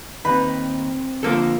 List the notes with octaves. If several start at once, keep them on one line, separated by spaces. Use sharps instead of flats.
D#2 C4 D#4 B4
D3 F3 A#3 A4